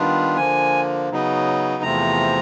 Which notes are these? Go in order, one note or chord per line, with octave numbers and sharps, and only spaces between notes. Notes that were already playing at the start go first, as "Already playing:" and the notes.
Already playing: D#3 G3 B3 D4 F4
D3 F3 A#3 G#5
C#3 F#3 B3 D#4
E2 C3 F3 A3 C4 A#5